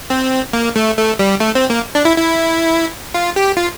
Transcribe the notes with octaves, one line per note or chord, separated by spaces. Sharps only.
C4
A#3
A3
A3
G3
A3
C4
A#3
D4
E4
E4
F4
G4
F4